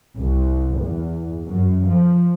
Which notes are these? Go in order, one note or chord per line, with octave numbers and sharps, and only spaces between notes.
C2
E2
F#2
F3